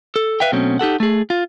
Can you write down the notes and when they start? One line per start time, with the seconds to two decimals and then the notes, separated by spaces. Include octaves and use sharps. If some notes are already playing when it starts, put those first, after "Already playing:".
0.16 A4
0.40 B4 E5 F5 G5
0.52 B2 F#3 A3 C4 C#4
0.79 D#4 G4 A4 F#5
1.00 A3 G#4
1.30 F4